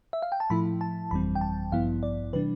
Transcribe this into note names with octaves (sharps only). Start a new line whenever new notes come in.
E5
F5
G5
A5
A2 F3 A3 E4 B5
A5
G1 F2 E3 G3 C4 B5
G5
A5
A1 G2 F3 B3 E4 F5
D5
C3 E3 G3 D4 B4